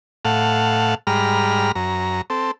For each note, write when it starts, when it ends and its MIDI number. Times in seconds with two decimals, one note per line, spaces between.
0.25 0.95 45
0.25 0.95 77
0.25 0.95 78
0.25 0.95 81
1.07 1.72 44
1.07 1.72 55
1.07 1.72 82
1.07 1.72 83
1.07 1.72 89
1.75 2.21 42
1.75 2.21 82
2.30 2.51 60
2.30 2.51 69